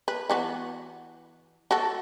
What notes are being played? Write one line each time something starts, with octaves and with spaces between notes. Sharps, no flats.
B4
E3 B3 F#4
F#4 A4